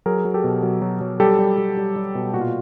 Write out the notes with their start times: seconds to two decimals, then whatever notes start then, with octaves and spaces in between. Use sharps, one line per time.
0.06 F#3 G#4 A#4
0.25 F#3
0.34 G4 A4
0.44 B2
0.63 F#3
0.82 F#3
1.01 F#3
1.20 G3 G4 A4
1.39 G3
1.58 G3
1.77 G3
1.96 G3
2.15 B2
2.34 A#2 F#4
2.41 F4